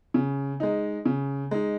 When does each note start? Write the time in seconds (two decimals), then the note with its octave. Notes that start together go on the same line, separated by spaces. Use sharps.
0.14 C#3
0.60 G#3 D#4
1.06 C#3
1.51 G#3 D#4